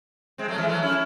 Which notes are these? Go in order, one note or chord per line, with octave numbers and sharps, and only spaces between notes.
G#3 C4
F#3 A3
E3 G#3
F#3 A3
C#4 E4